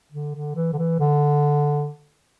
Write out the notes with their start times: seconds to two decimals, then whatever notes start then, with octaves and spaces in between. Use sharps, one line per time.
0.12 D3
0.35 D3
0.56 E3
0.73 D3
0.78 E3
1.00 D3